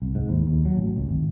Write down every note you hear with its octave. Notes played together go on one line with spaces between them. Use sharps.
C2
G#2
D#2
D#2
F#3
A1
C#2
G#1